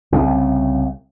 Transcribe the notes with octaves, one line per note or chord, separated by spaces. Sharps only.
C2 C#3